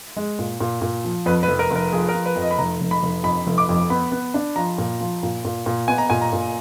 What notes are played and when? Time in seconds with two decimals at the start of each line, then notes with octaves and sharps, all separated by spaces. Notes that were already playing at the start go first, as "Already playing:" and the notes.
0.17 G#3
0.39 A#2
0.60 A#2
0.82 A#2
1.05 F3
1.26 F2 B4
1.43 B4
1.48 F1
1.59 A#4
1.71 F1
1.76 A#4
1.93 F3 G#4
2.09 A#4
2.14 F3
2.26 B4
2.36 F2
2.42 D#5
2.51 B5
2.58 F1 A#5
2.81 F1
2.91 B5
3.03 F1
3.24 F2 B5
3.47 F1
3.58 D6
3.69 F2
3.90 B3 B5
4.12 B3
4.34 D4
4.56 F3 A#5
4.78 A#2
5.01 F3
5.23 A#2
5.45 A#2
5.66 A#2
5.88 B3 G#5
5.98 A#5
6.10 A#2 G#5
6.21 A#5
6.33 A#2